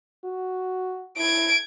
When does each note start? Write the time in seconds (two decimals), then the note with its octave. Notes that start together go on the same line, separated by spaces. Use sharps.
0.24 F#4
1.17 E4 G#6 D7